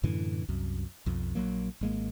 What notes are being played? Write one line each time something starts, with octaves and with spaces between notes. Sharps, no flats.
F#2 A2 D3 E3
C2 F#2
B1 F2
A#1 D#2 F#3 A#3
G#1 G#3 A#3